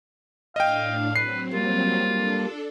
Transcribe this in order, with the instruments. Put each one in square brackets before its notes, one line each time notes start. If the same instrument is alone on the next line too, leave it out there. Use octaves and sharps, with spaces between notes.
[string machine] A2 D4 [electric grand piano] D#5 G5 [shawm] F5
[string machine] F#3 C4 [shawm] B4 [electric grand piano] C7
[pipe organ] G3 A#3 [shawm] F4
[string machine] D4 A4